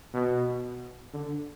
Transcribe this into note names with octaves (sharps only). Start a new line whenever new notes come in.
B2
D3